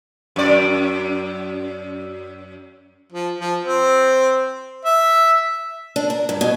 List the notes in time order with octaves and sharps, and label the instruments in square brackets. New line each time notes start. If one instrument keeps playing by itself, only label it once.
[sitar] F#2 D5
[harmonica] F3
F3
C4
E5
[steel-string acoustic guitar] D4
A#4
G2
B2